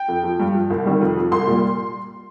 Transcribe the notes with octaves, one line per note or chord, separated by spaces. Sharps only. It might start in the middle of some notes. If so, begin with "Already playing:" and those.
Already playing: G5
F2
F3
G2
F3
C2
C3 D#3 G3
F2
F3
C2 C6
A#2 G3